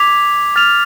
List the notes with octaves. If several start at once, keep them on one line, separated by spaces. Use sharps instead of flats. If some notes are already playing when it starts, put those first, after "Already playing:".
Already playing: D6 G#6 B6 F7
F6 A6 F7